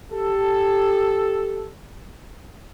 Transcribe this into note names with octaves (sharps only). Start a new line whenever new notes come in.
G4 A4